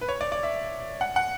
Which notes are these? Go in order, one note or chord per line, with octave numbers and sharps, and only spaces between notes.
B4
C#5
D5
D5
E5
F#5
F#5